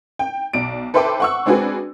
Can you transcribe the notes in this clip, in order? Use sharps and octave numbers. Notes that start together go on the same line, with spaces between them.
G5
B1 D5 D7
A4 B4 C5 E5 G5 D6
F#5 C#6 E6
G#3 C4 D4 F#4 G#4 B4